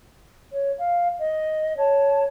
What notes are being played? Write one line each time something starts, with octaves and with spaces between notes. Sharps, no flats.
C#5
F5
D#5
C#5 A5